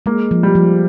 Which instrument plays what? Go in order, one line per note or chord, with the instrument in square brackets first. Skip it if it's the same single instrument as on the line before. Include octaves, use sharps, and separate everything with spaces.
[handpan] G#3 [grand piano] A#3
[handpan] F3
[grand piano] G3
[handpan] F3